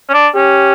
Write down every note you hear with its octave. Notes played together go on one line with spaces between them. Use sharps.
C#4
D4
C#4 G4